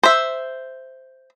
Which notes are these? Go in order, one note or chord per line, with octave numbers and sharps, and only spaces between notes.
C5 E5